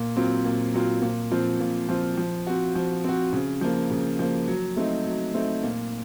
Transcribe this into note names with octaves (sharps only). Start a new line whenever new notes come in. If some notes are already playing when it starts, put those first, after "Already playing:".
Already playing: A#2
F#3 C4 F4
A#2
F#3 C4 F4
A#2
F3 C4 F4
A#2
F3 C4 F4
F3
C4 F#4
F3
C4 F#4
C#3
F3 A#3
C#3
F3 A#3
F#3
A3 C4 D#4
F#3
A3 C4 D#4
A#2